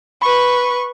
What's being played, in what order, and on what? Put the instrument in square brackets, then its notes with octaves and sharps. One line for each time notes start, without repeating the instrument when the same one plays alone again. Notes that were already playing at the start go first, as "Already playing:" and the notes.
[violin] B4 C#6 [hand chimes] B5